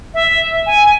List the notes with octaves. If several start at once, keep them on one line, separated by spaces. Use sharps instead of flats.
E5
G#5